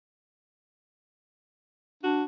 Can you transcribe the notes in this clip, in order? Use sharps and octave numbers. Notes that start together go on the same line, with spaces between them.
D4 F#4